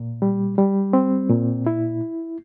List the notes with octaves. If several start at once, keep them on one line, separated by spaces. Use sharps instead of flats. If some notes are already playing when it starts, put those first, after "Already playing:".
Already playing: A#2
G3
G3
C4
A#2
E4